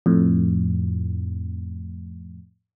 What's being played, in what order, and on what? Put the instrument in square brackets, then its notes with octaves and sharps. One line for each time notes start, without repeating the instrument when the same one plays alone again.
[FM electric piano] F2 A2